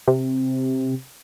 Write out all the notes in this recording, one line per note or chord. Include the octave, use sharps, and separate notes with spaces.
C3